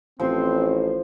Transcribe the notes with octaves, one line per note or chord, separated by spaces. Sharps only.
A1 F3 C4 C5